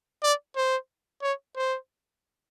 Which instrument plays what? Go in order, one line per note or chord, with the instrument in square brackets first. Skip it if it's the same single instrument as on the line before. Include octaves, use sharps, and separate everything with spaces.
[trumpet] D5
C5
C#5
C5